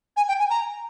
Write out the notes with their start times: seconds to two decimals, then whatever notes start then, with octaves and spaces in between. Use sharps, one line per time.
0.16 G#5
0.28 G5
0.39 G#5
0.50 A#5